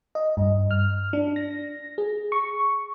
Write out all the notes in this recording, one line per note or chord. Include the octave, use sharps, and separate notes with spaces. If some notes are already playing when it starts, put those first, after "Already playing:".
D#5
G2
F6
D4
A#6
G#4
C#6